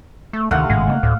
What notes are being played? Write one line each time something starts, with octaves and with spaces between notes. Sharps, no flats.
A3
D2 C3 D#3 A3 F5 F#5
G#1 A2 C#3 G#3
C#3 G3 A#3
D2 A2